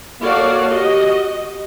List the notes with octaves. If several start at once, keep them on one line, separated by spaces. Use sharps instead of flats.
A#3 F#4 A4 C#5 D5 F5
F#4 G4 D#5